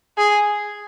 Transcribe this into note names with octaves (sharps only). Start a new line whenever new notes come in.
G#4